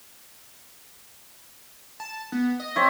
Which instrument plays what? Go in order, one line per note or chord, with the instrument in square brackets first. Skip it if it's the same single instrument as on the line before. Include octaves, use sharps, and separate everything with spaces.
[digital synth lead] A5
B3
D#5
[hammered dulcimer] C4 C#5 E5